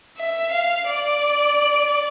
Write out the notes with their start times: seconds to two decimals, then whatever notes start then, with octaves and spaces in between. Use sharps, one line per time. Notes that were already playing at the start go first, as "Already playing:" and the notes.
0.17 E5
0.52 F5
0.87 D5